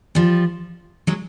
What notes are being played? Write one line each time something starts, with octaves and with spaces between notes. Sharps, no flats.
F3 G3
F#3 G#3